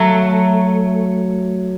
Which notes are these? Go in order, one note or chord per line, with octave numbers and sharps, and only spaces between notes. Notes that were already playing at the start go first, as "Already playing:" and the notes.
Already playing: F#3 A3